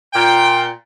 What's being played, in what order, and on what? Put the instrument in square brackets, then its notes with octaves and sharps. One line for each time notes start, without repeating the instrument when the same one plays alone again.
[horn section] A#2 G5